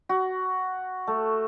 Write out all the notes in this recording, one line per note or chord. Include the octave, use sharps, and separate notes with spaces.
F#4
A3